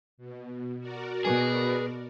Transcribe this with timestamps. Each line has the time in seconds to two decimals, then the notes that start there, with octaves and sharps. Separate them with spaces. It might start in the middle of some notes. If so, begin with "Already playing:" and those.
0.17 B2
0.79 F#4 A#4 D5
1.25 B2 G#4 B4